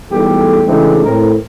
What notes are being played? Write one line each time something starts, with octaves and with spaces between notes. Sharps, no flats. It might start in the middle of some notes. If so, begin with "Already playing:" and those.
B1 E2 G3 A3 G4 A4
C#3 E3 G#3 A3 C4 D4
A2 C4 A#4